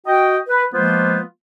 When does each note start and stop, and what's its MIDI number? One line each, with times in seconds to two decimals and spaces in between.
0.07 0.38 66
0.07 0.38 75
0.07 0.38 79
0.49 0.66 71
0.74 1.21 53
0.74 1.21 56
0.74 1.21 58
0.74 1.21 59
0.74 1.21 65
0.74 1.21 72